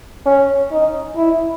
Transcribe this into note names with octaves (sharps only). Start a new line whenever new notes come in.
C#4
D#4
E4